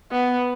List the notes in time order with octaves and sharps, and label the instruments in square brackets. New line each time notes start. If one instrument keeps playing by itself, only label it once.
[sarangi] B3